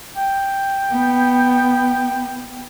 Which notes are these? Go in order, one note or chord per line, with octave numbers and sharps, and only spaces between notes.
G5
B3